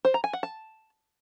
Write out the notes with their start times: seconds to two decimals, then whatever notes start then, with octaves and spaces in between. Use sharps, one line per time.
0.05 C5
0.14 A#5
0.24 G#5
0.33 F#5
0.43 A5